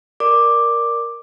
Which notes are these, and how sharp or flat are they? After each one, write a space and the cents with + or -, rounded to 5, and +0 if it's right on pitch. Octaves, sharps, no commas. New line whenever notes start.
A#4 +5 D5 +0 D6 +5